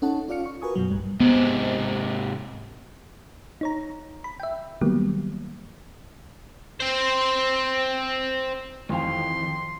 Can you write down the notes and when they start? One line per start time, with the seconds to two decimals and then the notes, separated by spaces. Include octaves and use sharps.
0.02 C#4 D#4 A4 F#5 A5
0.28 C#4 F4 D5 F5 F6 C#7
0.46 C#6
0.62 F#4 A#4 B4 G#5 C#6 D#6
0.76 F#2 B2 F#3
0.90 A1 G2 G3
1.20 G#2 C3 B3
3.61 D#4 C#5 A#5
4.24 B5
4.40 E5 G5
4.81 D#3 F#3 G3 A#3 B3 G4
6.80 C4 C5
8.89 F2 D#3 E3 F5 G5 C6